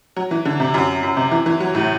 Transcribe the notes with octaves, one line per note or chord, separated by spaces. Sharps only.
F#3
E3
D3
C3
F#2
F#2
C3
E3
E3
F#3
A2